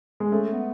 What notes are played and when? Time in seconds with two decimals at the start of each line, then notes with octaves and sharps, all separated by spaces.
0.20 G#3
0.32 A3 C#4
0.53 B3